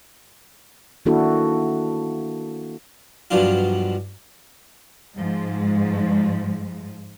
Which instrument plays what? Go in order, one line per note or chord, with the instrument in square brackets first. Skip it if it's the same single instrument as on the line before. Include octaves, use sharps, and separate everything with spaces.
[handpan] D#3 A#3 D4 E4 F#4 A4
[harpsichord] G2 B2 F3 F#3 D4 F4
[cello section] G#2 F3 G#3